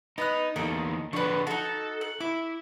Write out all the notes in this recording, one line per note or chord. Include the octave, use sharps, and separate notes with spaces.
B3 D#4 B5 F#6
E2 A#3 D#4 A4 D5
D3 F3 D4 B4 C#6
D#4 F#4 A4
F#5
E4 D6